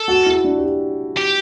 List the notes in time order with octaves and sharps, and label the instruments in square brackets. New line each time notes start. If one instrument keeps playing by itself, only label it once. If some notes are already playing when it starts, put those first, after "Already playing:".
Already playing: [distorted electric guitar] A4
[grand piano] F#4
E4
D4
G4
F#4
[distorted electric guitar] G4